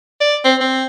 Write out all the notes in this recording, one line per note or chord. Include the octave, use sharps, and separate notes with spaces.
D5
C4
C4